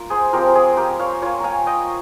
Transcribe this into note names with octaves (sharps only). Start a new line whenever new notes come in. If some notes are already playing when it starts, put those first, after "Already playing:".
Already playing: A#3 F4 A#4
G#4 C5
F3 G#3 C4 F4 G4 A#4
A#4
F4 G#4
G4 A#4
C#5 F5
A#3 F4 C#5 F5
F5 G#5 A#5
D#5 G5